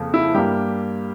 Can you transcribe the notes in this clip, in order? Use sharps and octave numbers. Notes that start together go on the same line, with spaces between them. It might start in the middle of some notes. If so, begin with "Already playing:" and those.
Already playing: F2 C#3 F3 A#3
E4
G2 G3 A#3 G4